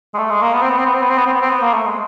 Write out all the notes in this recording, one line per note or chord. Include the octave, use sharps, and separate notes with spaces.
G#3
A3
G#3
A#3
B3
C4
B3
C4
B3
C4
B3
C4
B3
C4
B3
C4
B3
A#3
A3
G#3